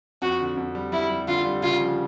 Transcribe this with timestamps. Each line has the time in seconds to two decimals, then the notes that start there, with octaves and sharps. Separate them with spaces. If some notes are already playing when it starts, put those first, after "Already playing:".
0.22 F2 F#4
0.40 D3
0.57 F2
0.75 G3
0.92 G3 E4
1.10 G3
1.28 D3 F4
1.45 G3
1.62 C#3 F4
1.80 F3